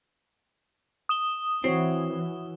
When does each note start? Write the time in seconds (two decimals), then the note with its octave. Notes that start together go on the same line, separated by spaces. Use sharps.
1.09 D#6 E7 G7
1.64 E3 C4 E4 F#4 C#5